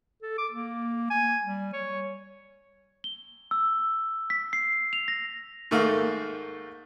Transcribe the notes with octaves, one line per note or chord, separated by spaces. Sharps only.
A4
D6
A#3
G#5
G3
C#5
G7
E6
B6
C7
F7
A#6
G#2 D#3 A3 A#3 F5